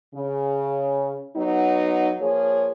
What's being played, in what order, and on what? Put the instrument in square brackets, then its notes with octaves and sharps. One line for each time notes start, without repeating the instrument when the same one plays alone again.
[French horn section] C#3
F#3 B3 D#4
F3 A#3 G#4 C#5